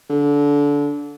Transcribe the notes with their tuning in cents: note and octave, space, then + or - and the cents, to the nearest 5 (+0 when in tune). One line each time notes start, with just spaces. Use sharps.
D3 -25